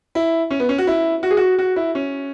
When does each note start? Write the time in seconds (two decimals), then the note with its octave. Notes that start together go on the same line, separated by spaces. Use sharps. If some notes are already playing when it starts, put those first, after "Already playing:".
0.15 E4
0.50 C#4
0.60 B3
0.69 C#4
0.78 F#4
0.87 E4
1.23 F#4
1.31 G#4
1.37 F#4
1.59 F#4
1.76 E4
1.95 C#4